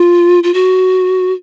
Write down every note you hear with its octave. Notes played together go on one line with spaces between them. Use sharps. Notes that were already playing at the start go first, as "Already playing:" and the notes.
Already playing: F4
F4
F#4